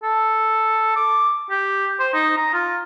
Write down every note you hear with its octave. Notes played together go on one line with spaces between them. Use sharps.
A4
D6
G4
C5
D#4
A#5
F4